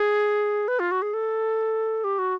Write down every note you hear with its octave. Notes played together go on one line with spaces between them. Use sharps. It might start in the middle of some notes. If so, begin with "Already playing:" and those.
Already playing: G#4
B4
F4
F#4
G#4
A4
G4
F#4